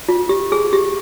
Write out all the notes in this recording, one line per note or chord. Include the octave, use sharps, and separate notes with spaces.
F4
G4
G#4
G4